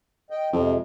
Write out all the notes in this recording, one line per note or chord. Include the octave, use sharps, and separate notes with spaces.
D#5 G5
F2 C3 G#3